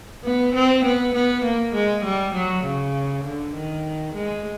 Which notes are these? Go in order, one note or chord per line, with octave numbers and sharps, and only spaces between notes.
B3
C4
B3
B3
A#3
G#3
G3
F#3
C#3
D3
D#3
G#3